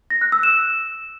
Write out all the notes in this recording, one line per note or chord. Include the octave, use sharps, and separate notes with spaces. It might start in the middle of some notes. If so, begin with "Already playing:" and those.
A#6
F#6
E6
E7